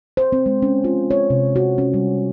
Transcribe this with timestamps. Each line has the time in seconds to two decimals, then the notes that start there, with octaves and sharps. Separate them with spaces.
0.17 C5
0.32 C4
0.46 G#3
0.62 C#4
0.84 F4
1.11 C#5
1.30 C3
1.56 F#4
1.78 C#4
1.94 G3